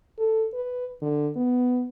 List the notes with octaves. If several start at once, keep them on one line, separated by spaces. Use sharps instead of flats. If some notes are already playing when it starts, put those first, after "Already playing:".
A4
B4
D3
B3